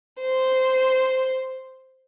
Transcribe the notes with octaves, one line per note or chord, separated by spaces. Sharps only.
C5